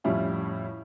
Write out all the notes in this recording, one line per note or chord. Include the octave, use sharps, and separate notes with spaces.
F2 A2 G3 C#4 E4 F4